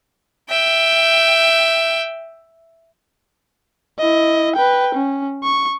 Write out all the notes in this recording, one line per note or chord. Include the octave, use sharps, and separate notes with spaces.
E5 G5
E4 D#5
B4 G5
C#4
C#6